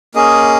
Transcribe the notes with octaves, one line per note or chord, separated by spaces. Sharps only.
A#3 C#4 G#4 D#5